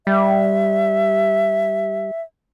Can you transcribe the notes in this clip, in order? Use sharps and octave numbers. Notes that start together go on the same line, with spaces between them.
G3 E5